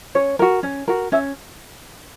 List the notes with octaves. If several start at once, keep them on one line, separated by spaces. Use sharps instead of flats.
C#4 C#5
F#4 A#4
C#4
F#4 A#4
C#4 E5